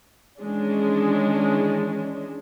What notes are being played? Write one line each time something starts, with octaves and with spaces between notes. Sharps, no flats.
D#3 E3 G#3 C#4 D4